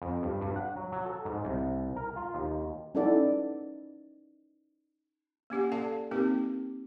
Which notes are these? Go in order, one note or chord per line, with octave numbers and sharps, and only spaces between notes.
F2
G2
G2
F#5
F#3
F#3
A4
G#2
C2
A#4
F4
D#2
C#4 D#4 E4 A4 D5 F#5
A#3 C#4 G4 F#5
A4 D5 F5 A5
A#3 C4 D#4 G4 A#4